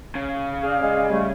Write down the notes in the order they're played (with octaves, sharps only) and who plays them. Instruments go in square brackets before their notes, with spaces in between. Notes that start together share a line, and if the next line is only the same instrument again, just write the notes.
[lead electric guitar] C#3
[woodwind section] G#4 D5 F5
[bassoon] G#3
[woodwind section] G3 A3